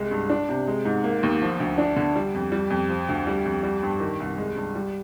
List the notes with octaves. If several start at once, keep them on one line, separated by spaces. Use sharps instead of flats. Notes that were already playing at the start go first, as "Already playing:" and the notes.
Already playing: C2 G#3
G2
D4
C3
G#3
G#2
A#3
D#2
F3
D2
D4
D3
G3
F2
G3
F2
F3
D2
G3
F2
G3
G2
D#3
C2
G#3
G2
G3